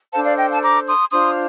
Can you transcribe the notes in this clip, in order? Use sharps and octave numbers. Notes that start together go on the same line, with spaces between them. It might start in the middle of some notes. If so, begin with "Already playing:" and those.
D4 A4 C5 F5 A5
D5 F5
D#5 G5
F5 A5
A#5 D6
C6 D#6
D4 F4 C5 C6 D#6